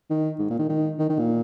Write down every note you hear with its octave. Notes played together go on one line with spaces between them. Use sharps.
D#3
G#2
A#2
D#3
D#3
D#3
D#3
A#2